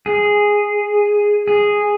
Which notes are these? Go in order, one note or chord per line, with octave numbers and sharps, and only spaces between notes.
G#4
G#4